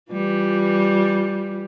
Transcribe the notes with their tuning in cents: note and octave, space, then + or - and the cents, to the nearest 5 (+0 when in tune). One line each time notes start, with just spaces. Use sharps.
E3 +5 G3 +0 F4 +10